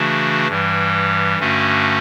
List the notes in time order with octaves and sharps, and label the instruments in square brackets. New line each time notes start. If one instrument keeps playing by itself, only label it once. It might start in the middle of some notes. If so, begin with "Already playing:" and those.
Already playing: [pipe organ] C#3 E3 A3 D4 F#4
G2 E3 G3
G2 D3 A3 C#4 F#4